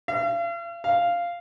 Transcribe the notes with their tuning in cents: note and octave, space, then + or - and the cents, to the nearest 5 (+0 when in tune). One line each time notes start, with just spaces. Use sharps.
F5 -40
F5 -5